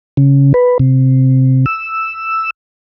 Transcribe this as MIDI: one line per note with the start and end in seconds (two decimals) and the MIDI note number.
0.17 0.53 49
0.54 0.78 71
0.79 1.66 48
1.66 2.50 88